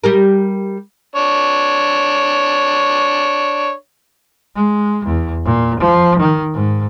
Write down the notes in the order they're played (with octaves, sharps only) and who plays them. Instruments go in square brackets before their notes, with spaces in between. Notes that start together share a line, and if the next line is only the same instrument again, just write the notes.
[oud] G3 G4 A#4
[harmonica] D4 C#5
[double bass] G#3
E2
A#2
F3
D#3
G#2